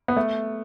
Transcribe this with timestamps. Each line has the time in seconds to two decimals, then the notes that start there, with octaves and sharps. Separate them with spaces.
0.08 B3
0.16 A3